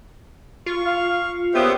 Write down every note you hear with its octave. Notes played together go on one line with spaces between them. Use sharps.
F4 C#6
F5
A#2 C#3 B3 G4 C5 E5